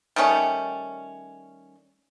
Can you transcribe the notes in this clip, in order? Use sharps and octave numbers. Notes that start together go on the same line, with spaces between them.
D#3 G3 A3 C#4